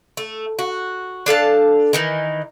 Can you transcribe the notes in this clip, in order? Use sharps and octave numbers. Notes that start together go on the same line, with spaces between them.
A3
F#4
D4 A4 F5 A5
D#3 E3 D#4